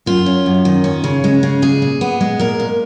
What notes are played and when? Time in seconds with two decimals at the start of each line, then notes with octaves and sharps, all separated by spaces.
0.06 F#2 F4
0.26 C#4
0.46 F#2
0.65 D#3
0.84 C#4
1.04 C#3
1.24 G#3
1.43 C#3
1.62 A#2 G#4
1.82 A#2
2.01 B3
2.21 G#3
2.39 A#2 A#4
2.60 A#2